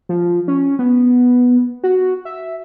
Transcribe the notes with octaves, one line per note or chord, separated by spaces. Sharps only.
F3
C#4
B3
F#4
E5